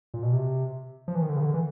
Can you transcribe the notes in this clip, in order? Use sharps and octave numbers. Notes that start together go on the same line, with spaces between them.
A#2
B2
C3
F3
E3
D#3
D3
C#3
D#3
D3
E3